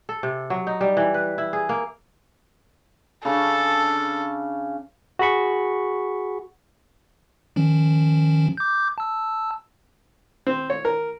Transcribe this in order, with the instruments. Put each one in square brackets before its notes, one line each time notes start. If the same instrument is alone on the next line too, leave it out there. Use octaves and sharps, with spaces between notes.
[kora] A4
C3
F#3
D#4
G3
E3
B4
E4
G#4
A#3
[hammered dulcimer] C#3 C#4 D4 [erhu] A4
[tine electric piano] F#4 G#4 B5 C#6
[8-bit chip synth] D#3 F3 C#4
D6 G6
A5 E6
[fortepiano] C4
C#5
A#4